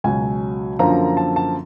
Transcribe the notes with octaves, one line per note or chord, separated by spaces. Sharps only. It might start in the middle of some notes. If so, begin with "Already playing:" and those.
C#2 B2 F#3 G#5
F#2 D3 F3 A#3 A#5
A5
A5